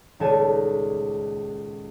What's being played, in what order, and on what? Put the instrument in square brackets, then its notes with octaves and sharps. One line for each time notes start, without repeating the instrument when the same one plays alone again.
[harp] D#1 C#2 A4 D5 G#5 A5